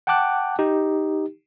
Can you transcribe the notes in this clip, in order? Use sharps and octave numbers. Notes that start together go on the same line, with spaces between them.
F#5 G5 A5 D6 F#6
D#4 G4